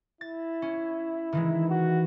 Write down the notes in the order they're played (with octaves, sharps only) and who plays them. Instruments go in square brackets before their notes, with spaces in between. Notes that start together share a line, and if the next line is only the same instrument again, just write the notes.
[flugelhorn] E4 [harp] A6
[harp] C#4
D#3 E3 G#3
[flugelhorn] F#4